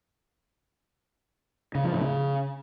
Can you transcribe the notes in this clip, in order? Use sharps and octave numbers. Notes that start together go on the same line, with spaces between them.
C#3
F3
A2
C#3